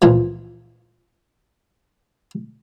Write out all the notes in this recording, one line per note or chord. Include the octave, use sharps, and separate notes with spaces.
C#2 A#2 E3 F3